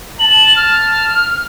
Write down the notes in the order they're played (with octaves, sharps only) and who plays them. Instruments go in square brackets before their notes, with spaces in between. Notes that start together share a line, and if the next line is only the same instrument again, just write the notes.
[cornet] A5 [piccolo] F#7
[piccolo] F6